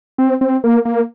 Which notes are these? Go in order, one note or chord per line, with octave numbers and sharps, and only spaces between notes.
C4
C4
A#3
A#3